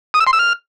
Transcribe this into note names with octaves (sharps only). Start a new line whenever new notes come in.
D#6
E6
C6
E6
F6